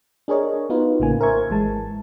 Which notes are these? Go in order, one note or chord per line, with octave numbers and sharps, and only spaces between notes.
D4 G#4 A#4 C#5 D#5
B3 D#4 F4 F#4 B4
A1 A2 C#3 A#3 G#5
A#4 C5 E5 G#5 C#6 G#6
G#1 E3 G#3 A5